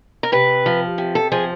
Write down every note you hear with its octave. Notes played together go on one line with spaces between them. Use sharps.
A#4
C3 B4
F3
C3
A4
F3 G#4